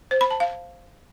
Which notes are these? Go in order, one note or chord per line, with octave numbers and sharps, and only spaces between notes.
C5
B5
A5
F5